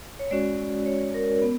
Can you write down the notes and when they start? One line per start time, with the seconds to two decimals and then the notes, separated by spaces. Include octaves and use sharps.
0.19 C#5
0.31 G#3 C#4 F#4 D5
0.86 C#5
1.14 A#4
1.42 B3